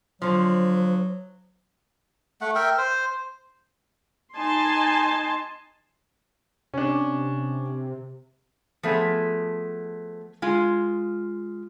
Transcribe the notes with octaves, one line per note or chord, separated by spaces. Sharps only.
D3 F3 F#3 C5
A3 F#5
A#4 E5 G5
C5
D#4 G#5 A5 C6
C3 C#4 D4
F3 A3 B3 G#4
G#3 F4